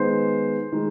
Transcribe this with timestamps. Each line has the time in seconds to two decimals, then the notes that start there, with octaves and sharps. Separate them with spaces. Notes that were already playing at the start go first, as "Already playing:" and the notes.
Already playing: D#3 G#3 B3 C5
0.72 D#3 G#3